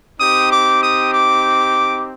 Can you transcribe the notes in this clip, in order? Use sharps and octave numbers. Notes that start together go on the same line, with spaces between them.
C4 D#4 G4 D#6
D6
D#6
D6